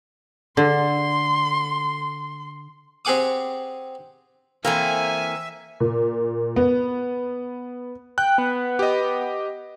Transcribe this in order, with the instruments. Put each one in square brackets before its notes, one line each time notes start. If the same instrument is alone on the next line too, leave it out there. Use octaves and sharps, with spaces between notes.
[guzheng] D3 [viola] C6
[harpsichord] C4 G4 G#4 F#5 D6 D#6
[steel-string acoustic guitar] E3 A4 A#5 [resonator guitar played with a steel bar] A#3 C4 [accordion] E5 [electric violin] G#5
[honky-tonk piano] A#2
B3
[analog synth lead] G5 [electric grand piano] F#6
[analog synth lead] B3
[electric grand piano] G4 D#5